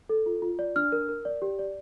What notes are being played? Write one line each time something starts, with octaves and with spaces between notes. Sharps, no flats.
A4
F4
F4
D5
D4 F6
A#4
A#4
D5
G4
D5